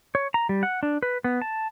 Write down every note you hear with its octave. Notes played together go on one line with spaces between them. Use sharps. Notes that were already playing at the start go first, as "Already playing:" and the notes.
C#5
A#5
G3
F#5
D4
B4
B3
A5